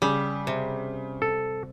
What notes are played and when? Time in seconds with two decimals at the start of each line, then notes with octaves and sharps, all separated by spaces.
0.02 C#3 G3
0.47 C3
1.22 A4